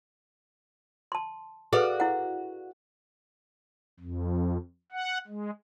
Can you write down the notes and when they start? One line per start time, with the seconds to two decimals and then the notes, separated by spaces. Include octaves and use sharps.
1.12 A5 C6
1.73 F#4 G#4 A4 B4 D5 F5
2.00 E4 F#5
4.00 F2
4.92 F#5
5.27 G#3